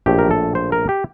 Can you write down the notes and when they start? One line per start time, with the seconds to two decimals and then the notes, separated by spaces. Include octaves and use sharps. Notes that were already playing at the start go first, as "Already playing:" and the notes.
0.06 A#1 A2 A3 G4
0.19 A#4
0.31 A4
0.55 C5
0.72 A#4
0.89 G4